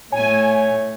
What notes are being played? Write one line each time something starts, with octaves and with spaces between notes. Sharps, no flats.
A2 A3 C#5 G#5